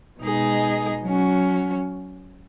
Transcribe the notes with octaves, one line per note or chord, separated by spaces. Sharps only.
B2 G#3 D#4 G#4 D#5
F#3 C#4 F#4